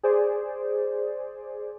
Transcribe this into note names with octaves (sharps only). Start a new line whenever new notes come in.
G#4 C5 D5